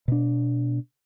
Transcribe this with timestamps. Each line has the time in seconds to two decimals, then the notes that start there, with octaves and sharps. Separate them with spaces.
0.08 B2 D4